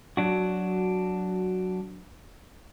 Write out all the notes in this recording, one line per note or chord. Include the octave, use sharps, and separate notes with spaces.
F#3 D4 F#4